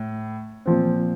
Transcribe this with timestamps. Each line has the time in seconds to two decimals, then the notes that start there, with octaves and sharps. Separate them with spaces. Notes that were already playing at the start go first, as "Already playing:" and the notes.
Already playing: A2
0.66 A#2 F3 C4